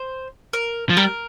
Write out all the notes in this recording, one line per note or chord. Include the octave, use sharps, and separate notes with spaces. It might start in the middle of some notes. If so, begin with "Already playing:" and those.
Already playing: C5
A#4
F3
G3 A#4